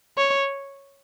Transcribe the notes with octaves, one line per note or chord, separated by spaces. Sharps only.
C#5